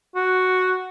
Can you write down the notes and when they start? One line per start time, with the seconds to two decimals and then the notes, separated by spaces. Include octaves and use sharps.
0.15 F#4